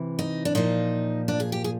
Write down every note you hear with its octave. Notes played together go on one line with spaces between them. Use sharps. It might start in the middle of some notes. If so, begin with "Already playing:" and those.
Already playing: C3 E3
D#4
D4
A#2 F3 D#4
D4
G#4
G4
G#4